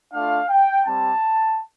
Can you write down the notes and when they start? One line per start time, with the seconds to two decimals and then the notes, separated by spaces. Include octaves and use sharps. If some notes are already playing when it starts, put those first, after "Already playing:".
0.13 A3 D4 F4 F5
0.49 G5
0.85 G3 C4 G4 A5